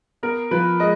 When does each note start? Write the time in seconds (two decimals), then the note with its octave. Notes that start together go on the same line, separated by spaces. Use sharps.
0.23 B3 A#4
0.51 F3 B4
0.80 G#3 D#5